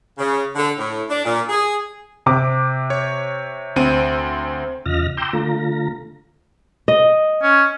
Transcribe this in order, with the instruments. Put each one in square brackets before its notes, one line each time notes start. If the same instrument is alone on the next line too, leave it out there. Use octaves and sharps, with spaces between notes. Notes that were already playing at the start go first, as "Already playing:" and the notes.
[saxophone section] C#3
D3
A2
D4
A#2
G#4
[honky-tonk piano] C3 D6
[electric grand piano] C#5
D2 C4 D#7
[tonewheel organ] E2 C#3 F4 D#5 F6 A#6
G5 A#5 C6 D6 E6 G6
D3 A3 F4 A#5
[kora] D#5
[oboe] C#4